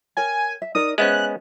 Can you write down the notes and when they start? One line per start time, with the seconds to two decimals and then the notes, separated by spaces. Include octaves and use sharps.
0.17 A#4 C#5 G5 G#5
0.62 E5
0.75 D#4 A#4 D5 D#6
0.98 G#3 B3 C#4 C5 E5 F#6